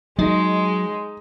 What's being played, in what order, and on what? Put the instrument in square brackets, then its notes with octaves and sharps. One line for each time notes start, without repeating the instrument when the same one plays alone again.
[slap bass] F#3 [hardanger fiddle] G#3 [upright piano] D#4